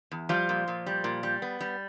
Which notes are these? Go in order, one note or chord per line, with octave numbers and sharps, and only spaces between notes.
E2
F3 G3 F4
A#2
A#2
G3
A#2
G3
B3
G3